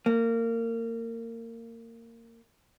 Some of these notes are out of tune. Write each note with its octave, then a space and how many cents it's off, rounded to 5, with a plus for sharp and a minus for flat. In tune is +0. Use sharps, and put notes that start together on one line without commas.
A#3 -25